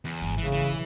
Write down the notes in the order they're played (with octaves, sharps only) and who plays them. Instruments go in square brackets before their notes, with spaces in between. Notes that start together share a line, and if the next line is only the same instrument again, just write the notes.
[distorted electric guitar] E2
[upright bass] G#1 G3
[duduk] C#3 [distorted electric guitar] E3
[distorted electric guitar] E3
[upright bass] B2 F#3